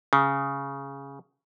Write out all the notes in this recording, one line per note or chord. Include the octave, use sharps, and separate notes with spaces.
C#3